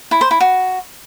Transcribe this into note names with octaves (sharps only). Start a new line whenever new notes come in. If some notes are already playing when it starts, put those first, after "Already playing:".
E4
C5
E4
F#4